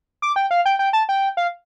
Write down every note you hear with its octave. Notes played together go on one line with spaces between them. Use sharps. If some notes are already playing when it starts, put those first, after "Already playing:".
D6
G5
F5
G5
G5
A5
G5
F5